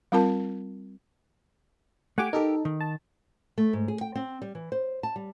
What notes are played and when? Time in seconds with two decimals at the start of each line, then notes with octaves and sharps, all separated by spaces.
0.12 G3 C4 F4 A#4 A5
2.18 A3 G4 F#5 G#5 D6
2.33 D#4 G4 A4 A#4
2.65 D#3
2.81 A5
3.58 A3
3.73 G#2
3.88 G#4
4.01 G5
4.15 C4
4.42 G3
4.55 E3
4.72 C5
5.03 A5
5.16 G3